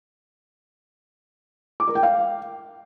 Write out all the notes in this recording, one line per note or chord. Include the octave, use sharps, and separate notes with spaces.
D6
A#4
G5
F5